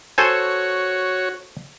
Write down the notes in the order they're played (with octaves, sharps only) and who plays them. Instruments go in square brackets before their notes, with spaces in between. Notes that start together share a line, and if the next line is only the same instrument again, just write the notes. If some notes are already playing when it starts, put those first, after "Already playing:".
[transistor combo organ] F#4 C#5 [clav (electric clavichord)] A4 C5 G#5